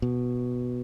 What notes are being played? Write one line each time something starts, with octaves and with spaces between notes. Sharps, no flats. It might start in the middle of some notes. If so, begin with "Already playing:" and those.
B2